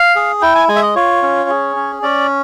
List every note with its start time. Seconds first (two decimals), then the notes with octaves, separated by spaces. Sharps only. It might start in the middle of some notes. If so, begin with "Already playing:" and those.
Already playing: F5
0.16 G#4
0.42 E4 G5
0.55 G#5
0.69 G#3 G#5
0.76 E5
0.82 D#5
0.95 F4 C#5
1.22 C#4
1.49 G#4
1.76 C#4
2.03 C#4 D5